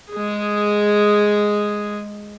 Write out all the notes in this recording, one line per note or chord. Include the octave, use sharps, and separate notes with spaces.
G#3 G#4